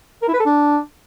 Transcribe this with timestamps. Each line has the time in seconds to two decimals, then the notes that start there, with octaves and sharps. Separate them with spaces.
0.22 A#4
0.28 E4
0.34 B4
0.40 A4
0.46 D4